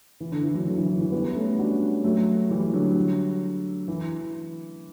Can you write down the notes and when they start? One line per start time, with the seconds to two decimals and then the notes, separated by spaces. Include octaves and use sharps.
0.20 E3
0.32 D3
0.43 E3
0.54 D3 F#3
0.67 D3 F#3
0.78 E3
0.89 E3
1.01 E3
1.12 G3 B3
1.35 A3 C#4
1.59 D4 F#4
2.04 F#3 A3
2.50 E3 G3
2.73 D3 F#3
3.88 E3